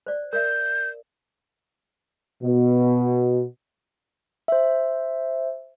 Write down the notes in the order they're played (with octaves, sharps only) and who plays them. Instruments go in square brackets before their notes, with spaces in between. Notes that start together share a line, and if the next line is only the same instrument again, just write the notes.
[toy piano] C5 D5
[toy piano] A#4 D5 E5 [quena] G6
[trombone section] B2
[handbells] C5 E5